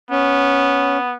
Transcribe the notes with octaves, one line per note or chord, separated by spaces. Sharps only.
B3 C#4